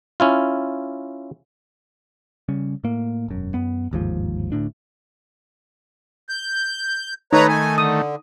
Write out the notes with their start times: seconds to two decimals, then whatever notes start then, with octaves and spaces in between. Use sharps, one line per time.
0.20 C#4 E4 F4
2.48 C#3 G3 C#4
2.84 A2 A#3
3.28 E1 F#2
3.54 F#2 B3
3.91 G1 D#2 G#2 F3
4.52 D1 D2 A2 D4
6.29 G6
7.33 D#3 A3 D#4 B4 C#5 A#5 B5
7.49 G#5
7.78 D3 D#6